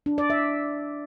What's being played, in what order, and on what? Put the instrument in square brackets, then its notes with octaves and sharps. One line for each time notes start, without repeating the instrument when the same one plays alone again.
[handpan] D4
D5
E5